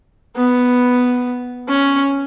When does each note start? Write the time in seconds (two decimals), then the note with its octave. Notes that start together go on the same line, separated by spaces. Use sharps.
0.36 B3
1.68 C#4